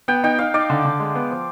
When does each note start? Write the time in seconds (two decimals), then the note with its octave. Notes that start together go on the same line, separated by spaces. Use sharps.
0.08 B3 G5
0.24 D#4 G5
0.39 D#4 F5
0.54 D#4 D5
0.70 D3
0.85 D3
1.00 G#3
1.15 B3
1.31 F3